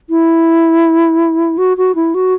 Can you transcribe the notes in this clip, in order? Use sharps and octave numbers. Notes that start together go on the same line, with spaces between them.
E4
F#4
F#4
E4
F#4